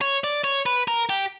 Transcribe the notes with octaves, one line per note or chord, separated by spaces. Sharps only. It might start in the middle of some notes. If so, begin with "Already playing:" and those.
C#5
D5
C#5
B4
A#4
G4